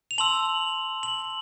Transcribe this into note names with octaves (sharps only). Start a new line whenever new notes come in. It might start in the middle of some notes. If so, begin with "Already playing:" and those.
F7
A5 C6 E6 F#7
F#7